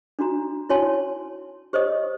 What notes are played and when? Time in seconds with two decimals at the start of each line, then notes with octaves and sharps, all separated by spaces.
0.19 D4 D#4 F#4 A#5
0.69 E4 F#4 C#5 G#5 A5 C6
1.73 G4 C5 C#5 D#5 D#6